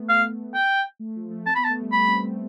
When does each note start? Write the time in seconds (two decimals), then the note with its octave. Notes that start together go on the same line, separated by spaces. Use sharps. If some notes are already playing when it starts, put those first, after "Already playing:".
Already playing: A3 B3
0.09 F5
0.54 G5
1.00 A3
1.16 F3
1.31 A3
1.46 C4 A5
1.55 B3 B5
1.64 A5
1.69 A3
1.81 G3
1.91 A3 B5
2.07 C4
2.23 A3